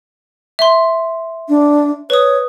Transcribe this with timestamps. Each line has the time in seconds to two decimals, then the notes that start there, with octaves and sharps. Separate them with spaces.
0.59 E5 C6
1.49 D4
2.10 B4 C#5 D#6